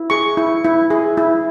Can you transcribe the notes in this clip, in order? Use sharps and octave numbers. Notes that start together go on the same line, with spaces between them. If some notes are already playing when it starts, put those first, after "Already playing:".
Already playing: E4
G#4 C#6
E4
E4
G#4
E4